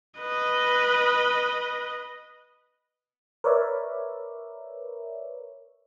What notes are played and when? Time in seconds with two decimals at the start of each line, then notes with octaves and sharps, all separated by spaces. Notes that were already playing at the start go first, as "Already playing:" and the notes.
0.20 B4 D#5
3.44 A#4 B4 C#5 D5 E5